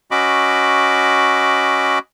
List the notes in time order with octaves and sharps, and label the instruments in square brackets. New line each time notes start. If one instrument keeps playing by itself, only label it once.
[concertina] C#4 F#4 D#5 B5 D6